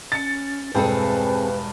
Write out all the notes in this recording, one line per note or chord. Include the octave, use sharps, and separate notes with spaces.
C#4 A6 C#7
E1 G2 C4 G#4 A4 B4 G5